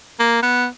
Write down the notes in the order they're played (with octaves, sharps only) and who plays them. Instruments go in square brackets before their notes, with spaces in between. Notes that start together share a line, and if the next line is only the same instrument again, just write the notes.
[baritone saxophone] A#3
B3